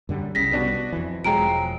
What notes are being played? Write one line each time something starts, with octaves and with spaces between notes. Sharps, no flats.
F#2 D3 G3
C2 C#3 G3 A#6 B6
B3 D4 F#4
F2 E3
E1 F3 F#3 G#3 G5 A#5 D7